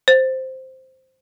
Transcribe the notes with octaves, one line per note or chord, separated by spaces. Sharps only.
C5